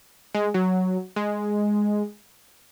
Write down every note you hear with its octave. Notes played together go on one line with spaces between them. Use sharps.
G#3
F#3
G#3